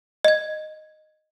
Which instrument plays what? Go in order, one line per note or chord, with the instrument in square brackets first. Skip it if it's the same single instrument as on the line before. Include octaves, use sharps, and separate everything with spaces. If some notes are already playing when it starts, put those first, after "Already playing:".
[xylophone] D#5 G#6